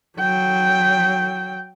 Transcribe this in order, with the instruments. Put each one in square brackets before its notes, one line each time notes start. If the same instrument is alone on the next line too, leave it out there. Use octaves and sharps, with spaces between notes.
[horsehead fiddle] F#3 G5